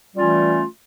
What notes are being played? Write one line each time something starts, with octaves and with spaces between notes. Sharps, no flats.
E3 G3 A3 C#4 F4